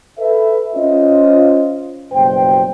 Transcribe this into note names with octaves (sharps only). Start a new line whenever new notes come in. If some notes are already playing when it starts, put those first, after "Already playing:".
A4 B4 E5
C#4 F4 C5 D#5
F#1 B2 G3 C5 G5